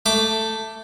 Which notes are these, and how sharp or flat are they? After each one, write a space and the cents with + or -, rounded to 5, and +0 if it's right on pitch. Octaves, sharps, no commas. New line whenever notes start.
A3 +10 D6 +0